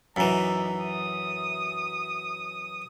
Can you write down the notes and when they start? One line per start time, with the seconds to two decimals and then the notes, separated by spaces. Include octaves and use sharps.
0.16 F#2 E3 D#4 E5 A#5
0.83 D#6